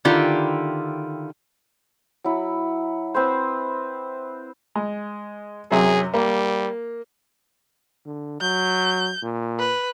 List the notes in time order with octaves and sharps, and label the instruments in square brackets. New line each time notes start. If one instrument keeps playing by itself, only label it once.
[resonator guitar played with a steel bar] D3 D#3 E4 F4 G4
[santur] F#3 E4
C4 B4 C5
[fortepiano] G#3
[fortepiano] F#2 C3 F#3 [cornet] G#4
[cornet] G3 [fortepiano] A#3
[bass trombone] D3
[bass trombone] F#3 [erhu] G6
[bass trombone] A#2
[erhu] B4